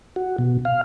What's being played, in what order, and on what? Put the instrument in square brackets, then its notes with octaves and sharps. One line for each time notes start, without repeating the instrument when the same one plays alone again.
[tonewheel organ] F#4
B2
F5